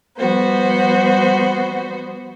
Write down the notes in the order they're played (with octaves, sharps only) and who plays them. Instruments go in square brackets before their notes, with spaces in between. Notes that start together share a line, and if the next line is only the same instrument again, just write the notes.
[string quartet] F3 G3 B3 F#4 C5